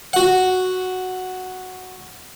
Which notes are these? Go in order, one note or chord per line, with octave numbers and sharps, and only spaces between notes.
F#4 F#5